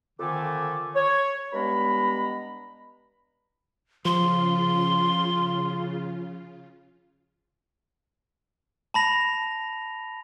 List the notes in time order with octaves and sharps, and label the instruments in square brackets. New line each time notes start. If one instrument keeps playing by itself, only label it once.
[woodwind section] F2 D3 D#3 A3 G#5 D6
C#5
G2 G#3 B3 A#5 B5
[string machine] C#3 F4 [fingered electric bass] F3 [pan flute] C6
[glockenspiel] A5 B5 A#6 F7